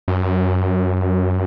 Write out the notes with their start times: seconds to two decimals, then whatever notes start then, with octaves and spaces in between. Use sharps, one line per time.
0.08 F#2